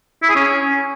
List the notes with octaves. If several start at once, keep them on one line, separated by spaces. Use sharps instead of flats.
E4
G#4
C#4